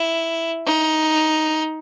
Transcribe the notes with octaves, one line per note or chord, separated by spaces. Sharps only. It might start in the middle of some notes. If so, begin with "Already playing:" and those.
Already playing: E4
D#4